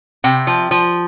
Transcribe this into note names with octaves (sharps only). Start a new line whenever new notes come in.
C3 G5
F3
F3